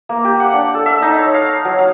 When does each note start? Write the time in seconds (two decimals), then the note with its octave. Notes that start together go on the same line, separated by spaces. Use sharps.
0.09 A#3
0.25 G4
0.40 F#5
0.54 D4
0.74 A4
0.86 E5
1.02 D#4
1.18 C#5
1.34 F5
1.65 F#3
1.79 F5